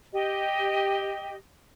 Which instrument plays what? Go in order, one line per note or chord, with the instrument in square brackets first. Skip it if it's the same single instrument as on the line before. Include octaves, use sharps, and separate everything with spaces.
[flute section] G4 D#5